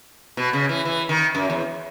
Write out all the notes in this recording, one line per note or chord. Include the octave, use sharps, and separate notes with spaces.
B2
C#3
E3
E3
D#3
F#2
E2